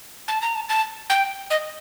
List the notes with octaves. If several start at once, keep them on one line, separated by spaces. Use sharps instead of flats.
A5
A#5
A5
A5
G5
D#5